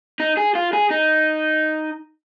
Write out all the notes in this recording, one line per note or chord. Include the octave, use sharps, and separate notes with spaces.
D#4
G#4
F4
G#4
D#4